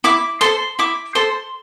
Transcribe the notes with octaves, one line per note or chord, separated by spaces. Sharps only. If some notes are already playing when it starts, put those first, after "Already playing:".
E4 D6
A4 C5 C6
E4 D6
A4 C5 C6